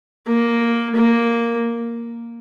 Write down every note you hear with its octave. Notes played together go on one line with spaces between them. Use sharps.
A#3
A#3